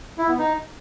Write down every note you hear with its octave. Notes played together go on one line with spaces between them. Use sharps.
E4
B3
D#4